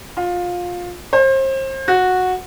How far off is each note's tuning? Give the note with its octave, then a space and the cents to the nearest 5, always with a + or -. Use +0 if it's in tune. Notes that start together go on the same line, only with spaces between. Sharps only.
F4 +20
C5 +35
F#4 -10